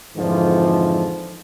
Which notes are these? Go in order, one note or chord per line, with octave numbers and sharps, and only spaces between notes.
F2 G#2 D3 E3 F3